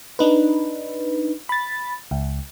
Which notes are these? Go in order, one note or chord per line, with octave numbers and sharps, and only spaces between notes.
D4 D#4 B4
B5 A6
C#2